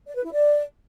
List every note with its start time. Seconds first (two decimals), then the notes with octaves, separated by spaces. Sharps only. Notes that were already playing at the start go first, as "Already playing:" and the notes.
0.07 D5
0.16 B4
0.24 E4
0.33 D5